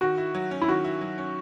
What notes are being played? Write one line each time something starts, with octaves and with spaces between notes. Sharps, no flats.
D#3 F#4
E4
F#3
C#4
E4
D#3 F#4
E4
F#3
C#4